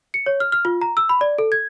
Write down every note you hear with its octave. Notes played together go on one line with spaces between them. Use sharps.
C#7
C#5
F6
F6
F4
A#5
E6
B5
D5
A4
G#6